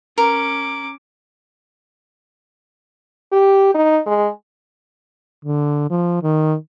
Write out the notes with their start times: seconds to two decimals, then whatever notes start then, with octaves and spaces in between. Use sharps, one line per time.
0.18 C#4 A#4 D6
3.32 G4
3.74 D#4
4.06 G#3
5.45 D3
5.90 F3
6.23 D#3